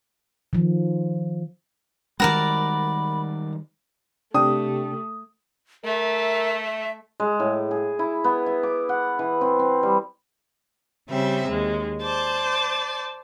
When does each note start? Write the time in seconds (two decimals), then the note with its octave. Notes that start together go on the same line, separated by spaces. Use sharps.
0.53 D#3 F3
2.20 D#3 G3 G#3 F#4 A#4 D5 B5
4.34 C3 A3 D4 G4 D#6
5.84 A3 A#4 E5
7.20 G#3
7.40 A2
7.71 G#4
7.99 E4
8.24 B3
8.46 E5
8.63 D6
8.89 F#5
9.19 E3
9.41 C4
9.59 C4
9.83 G3
11.08 C#3 G3 C4 E5
11.46 D#2 G#3
12.02 C5 D5 A5